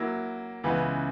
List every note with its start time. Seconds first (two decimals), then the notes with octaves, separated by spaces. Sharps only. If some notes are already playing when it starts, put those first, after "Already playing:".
Already playing: F#3 A#3 E4
0.64 C#2 C#3 E3 B3